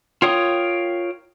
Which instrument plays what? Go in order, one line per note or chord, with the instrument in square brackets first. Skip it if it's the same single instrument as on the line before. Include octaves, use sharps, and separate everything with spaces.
[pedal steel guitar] F4 A#4 C#5 G5 D#6